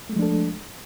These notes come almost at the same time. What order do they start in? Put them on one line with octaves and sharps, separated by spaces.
A3 G#3 F3 D4 A4